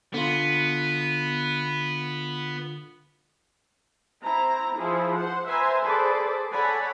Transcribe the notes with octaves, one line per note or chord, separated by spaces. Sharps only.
D3 B3 F4
C4 E4 A#5
F3 E4 G#4
C5 F#5
B4 C5 E5 G#5 A#5 C6
G#4 A4 B4 C5 D5
A4 C#5 D5 F#5 G#5 B5